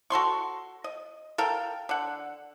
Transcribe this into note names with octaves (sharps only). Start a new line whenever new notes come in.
F#4 A4 C6 C#6
D#5
A4 A#4 F5 G5
D3 F#5